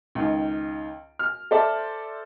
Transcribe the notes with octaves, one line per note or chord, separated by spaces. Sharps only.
C#2 D#3
F6
A4 C5 D5 E5 A5